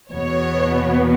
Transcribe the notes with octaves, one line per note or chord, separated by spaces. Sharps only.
E2 B2 B3 C#5